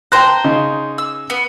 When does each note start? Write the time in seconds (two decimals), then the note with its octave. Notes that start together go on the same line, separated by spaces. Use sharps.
0.12 C5 G5 A5 A#5 F#6
0.44 C#3 D#4
0.98 E6
1.30 B3